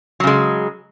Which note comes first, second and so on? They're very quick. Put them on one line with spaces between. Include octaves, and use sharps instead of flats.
F#3 C#3 G#3